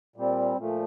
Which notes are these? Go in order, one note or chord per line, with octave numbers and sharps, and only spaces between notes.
A#2 G3 C4
A#2 F3 A3